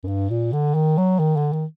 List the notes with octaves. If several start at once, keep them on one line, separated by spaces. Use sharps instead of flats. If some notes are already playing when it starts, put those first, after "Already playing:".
F#2
G2
A#2
D3
D#3
F#3
D#3
D3
D#3